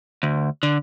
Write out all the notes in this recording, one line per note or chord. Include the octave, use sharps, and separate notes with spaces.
D2
D3